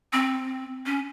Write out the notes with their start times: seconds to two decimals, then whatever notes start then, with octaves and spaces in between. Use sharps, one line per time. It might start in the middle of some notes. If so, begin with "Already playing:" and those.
0.13 C4
0.86 C#4